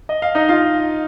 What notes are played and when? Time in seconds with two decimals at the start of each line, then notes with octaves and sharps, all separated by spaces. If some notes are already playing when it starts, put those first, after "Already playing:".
0.09 D#5
0.22 F5
0.35 D#4 D#5
0.49 F4 F5